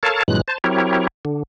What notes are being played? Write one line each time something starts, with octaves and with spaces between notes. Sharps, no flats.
A4 A#4 C#5 F5 A5
G2 A#2 E3 F#3 G#3 F#6
C5 A5
F#3 C4 E4 G4 A#4 C#5
D3